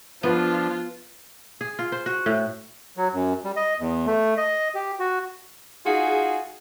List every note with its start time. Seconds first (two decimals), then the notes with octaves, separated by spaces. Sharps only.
0.23 F3 B3 D4 F4
1.61 G#4
1.79 F4
1.92 C5
2.06 F#4
2.26 A2
2.97 F#3
3.13 F#2
3.44 G3
3.56 D#5
3.80 E2
4.06 A3
4.37 D#5
4.75 G4
4.99 F#4
5.86 D#4 F4 F#4 G#4